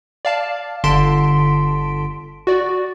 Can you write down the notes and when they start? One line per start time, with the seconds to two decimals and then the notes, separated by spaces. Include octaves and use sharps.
0.25 D5 F5 A5
0.84 G1 D3 A5 C6 B6 D7
2.47 F#4 D5